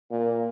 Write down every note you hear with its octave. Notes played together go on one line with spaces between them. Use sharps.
A#2